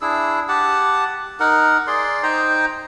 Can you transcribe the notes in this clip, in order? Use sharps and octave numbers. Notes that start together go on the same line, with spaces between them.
D4 E4 G#4 E6
G4 F#5 A5
D#4 A#4 F#5
G#4 D5 C6
D#4 C5 G5 A#5